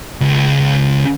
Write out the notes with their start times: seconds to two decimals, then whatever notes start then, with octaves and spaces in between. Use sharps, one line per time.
0.21 C#2